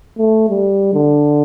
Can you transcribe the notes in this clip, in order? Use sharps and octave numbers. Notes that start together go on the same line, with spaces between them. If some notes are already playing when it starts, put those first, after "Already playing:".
A3
G3
D3